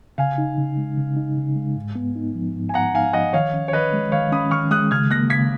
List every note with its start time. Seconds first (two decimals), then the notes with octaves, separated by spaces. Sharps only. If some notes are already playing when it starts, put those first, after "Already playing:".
0.18 C#3 F5 G#5
0.38 D#4
0.58 C#3
0.77 G#3
0.97 C#3
1.17 D#4
1.37 C#3
1.56 G#3
1.76 G#2
1.95 B3
2.16 D#4
2.35 F3
2.55 G#2
2.69 G#5
2.74 B3 F#5 A#5
2.94 D#4 F5 G#5
3.13 F3 D#5 F#5
3.33 D#3 C#5 F5
3.53 C#4
3.68 C#5
3.73 D#3 B4 D#5
3.93 G#3
4.12 D#3 C#5 F5
4.32 C#4 B5 D#6
4.51 D#3 C#6 F6
4.71 G#3 D#6 F#6
4.91 C#3 F6 G#6
5.11 A#3 F#6 A#6
5.30 C#3 G#6 B6